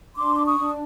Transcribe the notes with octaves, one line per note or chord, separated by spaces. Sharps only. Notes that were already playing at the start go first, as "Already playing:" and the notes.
D4 C6 D6
D6
C#6 D#6
D4